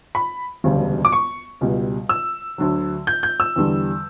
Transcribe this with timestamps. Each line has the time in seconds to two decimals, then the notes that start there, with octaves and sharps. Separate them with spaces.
0.15 B5
0.64 E1 D2 C#3 G3
1.05 D6
1.12 C#6
1.61 C#2 B2 G3
2.09 E6
2.58 D2 D3 F#3
3.07 G6
3.23 G6
3.40 E6
3.56 E2 D3 G3